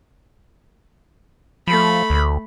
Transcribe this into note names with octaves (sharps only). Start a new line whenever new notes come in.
F3 A3 B5
D2